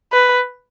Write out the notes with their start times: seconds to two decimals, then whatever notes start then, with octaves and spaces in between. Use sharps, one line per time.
0.13 B4